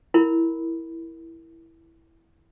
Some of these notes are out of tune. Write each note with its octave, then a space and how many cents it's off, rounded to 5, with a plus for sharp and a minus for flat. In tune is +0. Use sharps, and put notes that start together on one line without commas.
E4 +0 A#4 +0 B5 +0